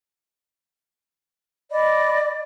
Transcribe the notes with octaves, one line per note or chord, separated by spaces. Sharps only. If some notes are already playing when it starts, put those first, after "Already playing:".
D5 D#5 B5